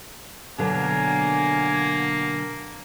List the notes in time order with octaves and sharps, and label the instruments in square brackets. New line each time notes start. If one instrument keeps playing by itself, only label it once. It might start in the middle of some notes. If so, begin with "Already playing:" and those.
[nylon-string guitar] B2 D3 F#3 [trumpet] A#3 [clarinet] G#5